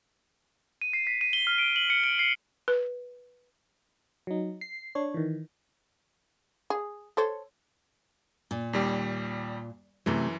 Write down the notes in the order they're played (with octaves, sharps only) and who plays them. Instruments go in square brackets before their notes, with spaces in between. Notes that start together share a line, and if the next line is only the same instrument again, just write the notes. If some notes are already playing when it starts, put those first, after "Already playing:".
[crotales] D#7
C7
B6
D#7
G7
F6
D7
F#7
C#7
D7
C7
[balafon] B4
[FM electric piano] F#3 D#4
C7
D4 C#5
D#3 E3
[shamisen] G#4
A4 C5 C#5
[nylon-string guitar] A#2
[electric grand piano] D#2 G3 G4
[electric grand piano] F#2 E3 [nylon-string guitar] C3 A3